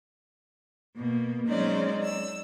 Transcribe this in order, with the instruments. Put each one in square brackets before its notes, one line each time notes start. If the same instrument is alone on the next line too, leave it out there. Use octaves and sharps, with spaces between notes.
[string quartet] B2 A#3
F#3 G#3 C4 C#4 D#4 D5
E6